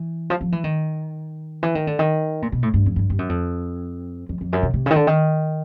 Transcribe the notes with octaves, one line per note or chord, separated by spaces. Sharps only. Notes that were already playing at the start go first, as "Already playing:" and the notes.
Already playing: E3
F3
F3
E3
D#3
E3
D#3
D3
D#3
A#2
B2
A2
G2
F2
G2
G2
F#2
F2
F2
F2
F#2
C3
C3
C#3
D#3
D3
D#3